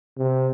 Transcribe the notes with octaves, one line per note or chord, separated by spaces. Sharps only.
C3